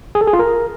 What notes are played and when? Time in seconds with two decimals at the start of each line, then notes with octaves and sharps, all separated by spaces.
0.15 G#4
0.21 A4
0.27 G#4
0.33 F4
0.39 A#4